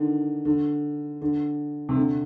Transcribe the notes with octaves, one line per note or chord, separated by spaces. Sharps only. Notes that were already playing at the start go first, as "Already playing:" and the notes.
Already playing: D3 D#3
D3
D3
C3
D3